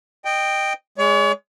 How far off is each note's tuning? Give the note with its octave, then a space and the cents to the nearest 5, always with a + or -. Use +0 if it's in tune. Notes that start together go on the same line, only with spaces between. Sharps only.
D#5 -20 G5 +0
G#3 +0 C#5 +40